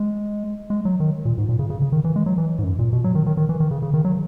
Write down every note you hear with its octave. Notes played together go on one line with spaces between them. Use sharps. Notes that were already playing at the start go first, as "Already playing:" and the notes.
Already playing: G#3
G#3
F#3
D#3
A#2
G#2
A#2
C#3
C#3
C#3
D#3
E3
G#3
F#3
E3
G#2
F#2
A#2
B2
F#3
D#3
D#3
D#3
E3
D#3
C#3
C#3
D#3
F#3